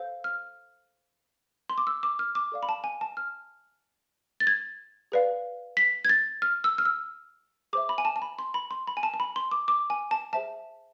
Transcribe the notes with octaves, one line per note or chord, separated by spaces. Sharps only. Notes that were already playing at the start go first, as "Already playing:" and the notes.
Already playing: A4 C5 F5
F6
C6
D6
E6
D6
F6
D6
A4 D5 F5
B5
A5
G#5
A5
F6
A6
G#6
G#4 B4 D5 F5
B6
G#6
A6
F6
E6
F6
E6
G#4 C5 E5 D6
B5
G#5
A5
A5
B5
C6
B5
C6
B5
G#5
A5
A5
B5
C6
D6
D6
G#5
A5
G#4 C5 E5 A5